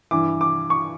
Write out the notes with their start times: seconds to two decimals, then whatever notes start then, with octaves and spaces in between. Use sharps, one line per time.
0.11 G2 E3 D6
0.41 D6
0.70 C#6